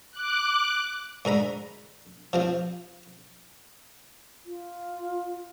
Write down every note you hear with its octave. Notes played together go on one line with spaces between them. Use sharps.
D6 F#6
G#2 D3 A#5 B5
F3 C4 F4
F4